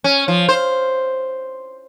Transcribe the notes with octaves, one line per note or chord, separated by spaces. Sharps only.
C#4
F3
C5